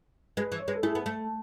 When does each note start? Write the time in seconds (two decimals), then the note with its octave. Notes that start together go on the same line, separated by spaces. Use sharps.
0.37 G#3 G#4 B4
0.52 E3
0.60 C#5
0.68 G#3 B4
0.75 A4
0.83 A3 E4 G#4
0.95 B3
1.06 A3